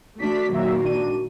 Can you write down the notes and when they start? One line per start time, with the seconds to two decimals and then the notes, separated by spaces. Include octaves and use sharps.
0.19 A3 D4 F#4 B6
0.50 A#2 D#3 F#3 A#3 E5
0.83 G#1 D4 D#7